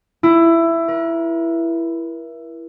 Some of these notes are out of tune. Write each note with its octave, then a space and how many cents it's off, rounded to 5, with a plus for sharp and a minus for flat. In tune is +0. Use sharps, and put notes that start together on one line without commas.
E4 +15
A#4 +45